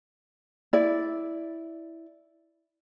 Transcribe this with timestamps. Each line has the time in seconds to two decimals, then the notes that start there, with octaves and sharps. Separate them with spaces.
0.73 E4 D5